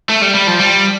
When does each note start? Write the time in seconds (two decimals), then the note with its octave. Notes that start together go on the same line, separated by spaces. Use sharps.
0.09 A3
0.22 G3
0.35 G3
0.47 F3
0.60 G3